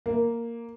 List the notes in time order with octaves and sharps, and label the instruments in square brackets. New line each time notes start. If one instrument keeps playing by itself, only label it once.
[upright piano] A#3